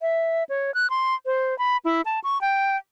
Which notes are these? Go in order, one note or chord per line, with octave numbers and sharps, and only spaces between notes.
E5
C#5
F#6
C6
C5
B5
E4
A5
C#6
G5